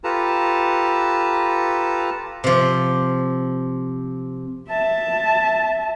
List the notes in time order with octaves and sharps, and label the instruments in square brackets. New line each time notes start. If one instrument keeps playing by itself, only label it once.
[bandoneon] F4 G4 A4 B4 A5 A#5
[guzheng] C3 F3
[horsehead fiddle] E5 A5